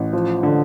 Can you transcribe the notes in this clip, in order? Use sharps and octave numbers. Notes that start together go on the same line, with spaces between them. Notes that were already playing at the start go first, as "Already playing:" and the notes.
Already playing: A1
F3
D3